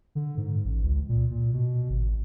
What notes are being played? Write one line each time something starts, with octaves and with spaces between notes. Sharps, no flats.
D3
G#2
A1
C#2
A#2
A#2
B2
G#1